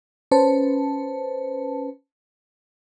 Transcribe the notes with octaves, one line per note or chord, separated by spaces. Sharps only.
C#4 B4 C5 A5